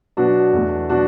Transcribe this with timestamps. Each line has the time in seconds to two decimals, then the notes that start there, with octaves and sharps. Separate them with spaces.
0.17 B2 F#3 B3 D4 F#4
0.53 E2 B2 A3
0.90 B2 F#3 B3 D4 F#4